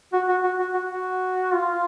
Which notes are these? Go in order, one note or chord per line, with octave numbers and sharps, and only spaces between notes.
F#4
F#4
F#4
F#4
F#4
F#4
F4